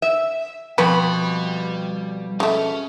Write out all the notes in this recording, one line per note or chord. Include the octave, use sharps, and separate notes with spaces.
E5
F2 B2 G3 B4 B5
G#3 A3 C#4